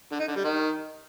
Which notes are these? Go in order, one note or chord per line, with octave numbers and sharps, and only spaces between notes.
D3
D#4
D3
G3
D#3